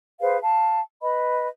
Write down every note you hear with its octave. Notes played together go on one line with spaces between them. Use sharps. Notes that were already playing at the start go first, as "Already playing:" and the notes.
G#4 B4 C5 F5
F5 A5
B4 D#5 B5